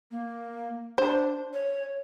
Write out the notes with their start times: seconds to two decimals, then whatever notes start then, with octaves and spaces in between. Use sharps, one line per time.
0.11 A#3
0.98 D4 C5
1.53 C#5